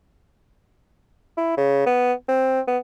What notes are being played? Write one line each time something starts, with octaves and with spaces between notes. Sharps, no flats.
E4
C#3
B3
C4
B3